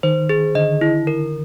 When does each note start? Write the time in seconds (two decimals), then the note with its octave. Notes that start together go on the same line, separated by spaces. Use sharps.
0.03 D#3 C5
0.29 G#4
0.55 D3 D#5
0.81 E4
1.07 A#4